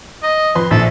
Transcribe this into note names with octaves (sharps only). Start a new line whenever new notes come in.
D#5
F2 B4 C6
A#1 A4